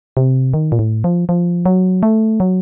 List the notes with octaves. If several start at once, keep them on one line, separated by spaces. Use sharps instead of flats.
C3
D#3
A#2
A2
F3
F3
F#3
A3
F#3